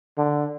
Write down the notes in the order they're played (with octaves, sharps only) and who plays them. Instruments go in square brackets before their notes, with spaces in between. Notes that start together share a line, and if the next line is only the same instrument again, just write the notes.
[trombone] D3